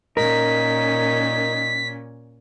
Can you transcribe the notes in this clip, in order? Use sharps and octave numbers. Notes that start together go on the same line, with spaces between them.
A#2 C#4 D#4 A#4 B6